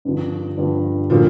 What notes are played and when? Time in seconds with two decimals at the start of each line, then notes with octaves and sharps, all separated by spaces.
0.05 G2 D3 F3
0.57 G2 D3 F3
1.10 A#2 D3 F3 G3 A#3